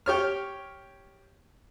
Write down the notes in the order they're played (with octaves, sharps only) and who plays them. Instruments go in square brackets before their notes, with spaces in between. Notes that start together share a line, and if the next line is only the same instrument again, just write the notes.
[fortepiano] G4 C#5 F6